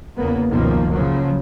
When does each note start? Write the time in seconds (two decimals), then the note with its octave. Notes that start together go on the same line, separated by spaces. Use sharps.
0.17 E2 C#3 A#3 B3
0.50 C#2 F#2 B2 D#3 F3 A#3
0.93 C#3 F3 F#3